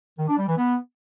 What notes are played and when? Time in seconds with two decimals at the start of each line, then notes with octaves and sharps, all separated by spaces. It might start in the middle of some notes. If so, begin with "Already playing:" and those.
0.18 D#3
0.28 D4
0.38 G3
0.48 E3
0.58 B3